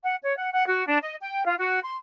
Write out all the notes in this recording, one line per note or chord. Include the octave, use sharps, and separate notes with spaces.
F#5
C#5
F#5
F#5
F#4
D4
D#5
G5
F4
F#4
C6